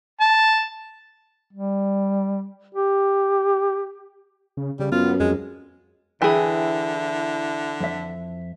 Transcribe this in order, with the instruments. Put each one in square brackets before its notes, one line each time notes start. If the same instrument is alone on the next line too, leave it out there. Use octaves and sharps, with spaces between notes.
[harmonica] A5
[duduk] G3
G4
[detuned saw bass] C#3
[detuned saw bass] C#3 [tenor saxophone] G3
[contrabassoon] F#2 [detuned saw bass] B3 [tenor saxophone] F4
[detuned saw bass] F2 [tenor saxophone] G#3
[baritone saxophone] D3 [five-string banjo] E3 G#4 [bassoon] E4 [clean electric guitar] G5 B5
[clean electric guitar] F2 E5